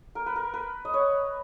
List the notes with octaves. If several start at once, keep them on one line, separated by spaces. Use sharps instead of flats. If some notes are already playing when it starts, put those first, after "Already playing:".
A#4
B4
A#4
B4
D#5
C#5